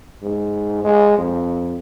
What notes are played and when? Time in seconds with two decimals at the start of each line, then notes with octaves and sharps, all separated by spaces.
0.22 G#2
0.84 G#3
1.18 F2